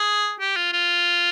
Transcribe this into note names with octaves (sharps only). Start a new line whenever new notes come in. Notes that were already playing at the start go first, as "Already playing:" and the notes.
Already playing: G#4
G4
F4
F4